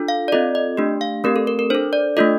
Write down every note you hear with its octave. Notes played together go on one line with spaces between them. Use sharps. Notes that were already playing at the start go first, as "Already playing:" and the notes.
Already playing: D4 F4 A4
F5
D5
C4 F4 A4 D#5
D#5
A3 D4 G4
F5
A3 C4 G4 A#4
A4
A#4
A#4
D4 A4 C5
D5
A3 D4 F4 A4 D#5